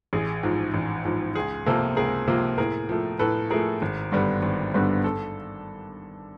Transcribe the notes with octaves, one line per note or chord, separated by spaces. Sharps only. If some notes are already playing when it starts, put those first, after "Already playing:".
A1 G#4
G#2 F3
A1
G#2 F3
C#2 G#4
C3 F3 A#3 A4
C#2 G#4 A#4
C3 F3 A#3
A2 G#4 A#4
F3 A3
A2 A4 B4
F3 A3 G#4 A#4
G#1
G2 D3 G3 B3
G#1
G2 D3 G3 B3
A4